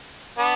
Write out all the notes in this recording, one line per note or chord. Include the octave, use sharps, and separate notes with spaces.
B3 D4